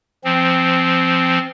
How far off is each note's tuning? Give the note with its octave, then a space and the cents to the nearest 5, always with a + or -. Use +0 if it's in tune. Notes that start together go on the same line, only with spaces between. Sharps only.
F3 -15 C4 +0